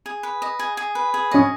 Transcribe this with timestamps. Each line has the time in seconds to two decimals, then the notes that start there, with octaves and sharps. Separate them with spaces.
0.06 G#4
0.23 B4
0.42 D#5
0.59 G#4
0.77 G#4
0.95 B4
1.14 G#4
1.31 C#4 D#5